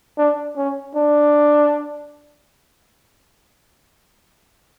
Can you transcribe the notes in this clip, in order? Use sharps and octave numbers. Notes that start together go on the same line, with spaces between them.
D4
C#4
D4